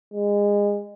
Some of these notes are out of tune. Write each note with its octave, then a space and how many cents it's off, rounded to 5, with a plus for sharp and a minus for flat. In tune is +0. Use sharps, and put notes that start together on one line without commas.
G#3 -25